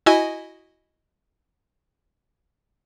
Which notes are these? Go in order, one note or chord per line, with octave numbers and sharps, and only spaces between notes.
E4 F#4 D#5 G#5